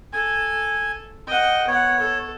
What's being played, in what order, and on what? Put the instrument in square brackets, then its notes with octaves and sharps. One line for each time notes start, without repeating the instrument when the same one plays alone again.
[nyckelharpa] A4 [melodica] G#5
[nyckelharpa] D#5 F#5 [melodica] G5
[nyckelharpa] B3 F#5 [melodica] C#5
[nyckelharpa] A4